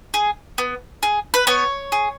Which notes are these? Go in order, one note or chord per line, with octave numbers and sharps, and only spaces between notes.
G#4
B3
G#4
B4
B3 C#5
G#4